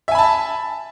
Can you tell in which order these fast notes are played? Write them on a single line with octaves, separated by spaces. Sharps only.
E5 G#5 B5 A5